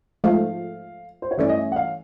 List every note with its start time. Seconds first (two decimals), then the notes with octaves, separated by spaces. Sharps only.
0.24 G#2 F3 A3 F5
1.22 C5
1.31 C#5
1.38 G2 E3 A3 C#4 D5
1.49 D#5
1.57 E5
1.72 F#5
1.76 F5